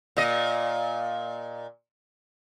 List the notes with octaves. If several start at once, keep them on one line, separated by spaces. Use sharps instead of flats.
A#2 D#5